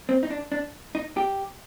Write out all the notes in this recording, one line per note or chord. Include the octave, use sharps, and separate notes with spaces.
C4
D#4
D4
D4
D#4
G4